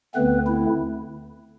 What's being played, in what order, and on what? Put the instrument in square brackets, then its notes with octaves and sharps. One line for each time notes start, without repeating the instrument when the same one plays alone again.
[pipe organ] D2 D3 A3 B3 C4 B4
E4